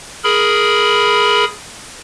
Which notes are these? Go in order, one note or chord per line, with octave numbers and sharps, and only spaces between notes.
G#4 A#4 B5